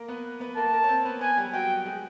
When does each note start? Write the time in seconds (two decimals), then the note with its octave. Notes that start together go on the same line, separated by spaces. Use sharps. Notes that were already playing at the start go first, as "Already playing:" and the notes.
Already playing: A#3 A#4
0.08 B3 B4
0.40 B3 B4
0.56 A#3 A#4 A5
0.73 A#3 A#4
0.84 C#5
0.88 C4 C5
1.05 B3 B4
1.21 B3 B4 G#5
1.37 G3 G4
1.53 F#3 F#4 G5
1.86 G#3 G#4